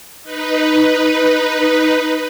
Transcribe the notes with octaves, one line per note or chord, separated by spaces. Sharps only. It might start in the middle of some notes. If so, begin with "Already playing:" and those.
D#4 B4